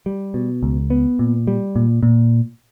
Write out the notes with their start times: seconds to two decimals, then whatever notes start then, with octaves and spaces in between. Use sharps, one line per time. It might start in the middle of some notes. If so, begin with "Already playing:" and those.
0.06 G3
0.34 B2
0.63 C#2
0.90 B3
1.19 A#2
1.47 G3
1.76 A#2
2.03 A#2